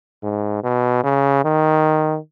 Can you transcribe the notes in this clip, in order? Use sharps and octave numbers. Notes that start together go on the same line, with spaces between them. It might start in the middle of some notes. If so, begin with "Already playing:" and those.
G#2
B2
C#3
D#3